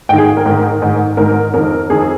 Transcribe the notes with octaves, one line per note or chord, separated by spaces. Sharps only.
G#2 D#3 G#4 G5
A#4
G#2 D#3
G#2 D#3
G#2 D#3 A#4
F2 D#3 A#4
F2 D#3 G#4